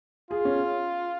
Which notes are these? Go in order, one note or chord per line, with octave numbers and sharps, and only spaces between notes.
F4 G#4
C#4